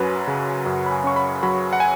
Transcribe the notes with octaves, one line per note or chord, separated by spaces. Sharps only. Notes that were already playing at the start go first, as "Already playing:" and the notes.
Already playing: F#2 F#3 C#4 B4
C#3
F#2 F#5
B5
G#5
C#4 C#6
B5
F#3 B5
F#5
G#5